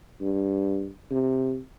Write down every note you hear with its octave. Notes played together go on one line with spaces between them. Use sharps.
G2
C3